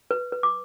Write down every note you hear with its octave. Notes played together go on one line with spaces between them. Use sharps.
B4
B4
D6